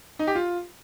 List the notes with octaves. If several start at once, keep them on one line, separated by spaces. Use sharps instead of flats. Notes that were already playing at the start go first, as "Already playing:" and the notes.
D#4
G4
F4